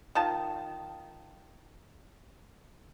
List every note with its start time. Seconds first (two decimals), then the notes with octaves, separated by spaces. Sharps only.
0.15 D#3 F4 A5